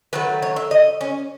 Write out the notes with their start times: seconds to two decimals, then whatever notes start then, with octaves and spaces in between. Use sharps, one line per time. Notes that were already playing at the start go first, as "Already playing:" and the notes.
0.13 D#3 F#3 A3 B4
0.42 C#5
0.56 E5
0.71 D#5
1.01 C#4